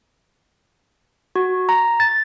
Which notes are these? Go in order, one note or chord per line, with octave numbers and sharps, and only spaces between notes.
F#4
A#5
A6